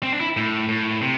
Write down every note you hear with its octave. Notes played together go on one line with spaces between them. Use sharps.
C4
D4
E4
A2
A2
C3